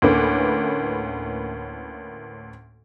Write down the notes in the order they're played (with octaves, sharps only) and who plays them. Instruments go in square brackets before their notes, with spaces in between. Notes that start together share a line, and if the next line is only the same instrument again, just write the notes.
[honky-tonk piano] D2 A2 A#3 C#4 B4 D6